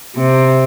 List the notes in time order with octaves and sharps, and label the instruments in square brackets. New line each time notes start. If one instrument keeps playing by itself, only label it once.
[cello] C3